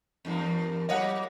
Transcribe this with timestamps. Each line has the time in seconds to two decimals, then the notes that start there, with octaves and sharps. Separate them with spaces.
0.25 E2 G2 A#3
0.89 F#3 A#3 C#5 D#5 F#5